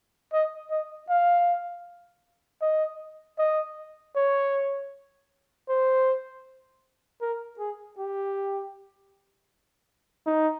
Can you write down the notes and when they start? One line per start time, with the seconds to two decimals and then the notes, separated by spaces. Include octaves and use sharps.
0.33 D#5
0.71 D#5
1.10 F5
2.62 D#5
3.39 D#5
4.16 C#5
5.69 C5
7.21 A#4
7.59 G#4
7.98 G4
10.26 D#4